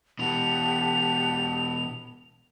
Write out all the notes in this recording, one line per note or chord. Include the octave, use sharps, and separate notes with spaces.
B2 E3 G4 F#5 A5 F7